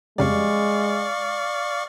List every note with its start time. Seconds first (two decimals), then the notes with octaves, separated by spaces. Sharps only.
0.18 F2 C#3 G3 G#3 D5 F5 C#6